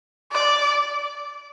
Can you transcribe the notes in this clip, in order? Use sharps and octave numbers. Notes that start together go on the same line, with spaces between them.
D5